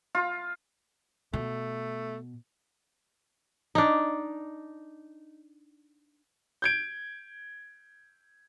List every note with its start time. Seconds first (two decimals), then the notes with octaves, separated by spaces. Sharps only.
0.15 F4
1.33 B2 A3
3.75 D4 D#4
6.62 G6 G#6 D7